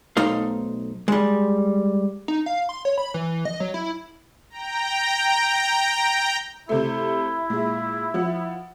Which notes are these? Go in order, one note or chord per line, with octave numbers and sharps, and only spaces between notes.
B1 B2 A3 D#4 C5 F5
G3 G#3
D#4
F5
C6
C#5
B5
E3
D#5
F#3
E4
G5 A#5
C3 A3 E4
A#2 G#3
F3 F#5